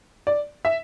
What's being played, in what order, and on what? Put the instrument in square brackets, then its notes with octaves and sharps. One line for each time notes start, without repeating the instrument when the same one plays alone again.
[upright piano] D5
E5